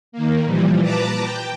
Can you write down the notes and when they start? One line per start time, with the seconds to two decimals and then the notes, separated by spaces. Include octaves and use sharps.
0.12 D#3 A#3
0.45 A#2 E3 F3 G3
0.82 B4 A5 A#5 D6
1.21 G5